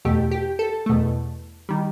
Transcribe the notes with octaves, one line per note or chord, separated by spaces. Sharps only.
E2 B2 A3 G4
G4
A4
E2 B2 A3
D#3 G3